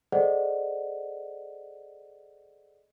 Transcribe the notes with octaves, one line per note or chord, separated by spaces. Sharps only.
G#4 A4 C5 D5 D#5 F#5